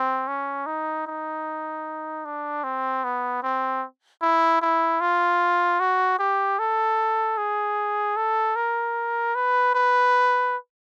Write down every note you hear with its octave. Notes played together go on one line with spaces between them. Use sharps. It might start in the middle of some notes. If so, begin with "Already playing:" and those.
Already playing: C4
C#4
D#4
D#4
D4
C4
B3
C4
E4
E4
F4
F#4
G4
A4
G#4
A4
A#4
B4
B4